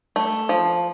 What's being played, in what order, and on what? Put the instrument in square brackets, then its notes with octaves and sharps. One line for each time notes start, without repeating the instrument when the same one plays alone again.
[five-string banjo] A3
F3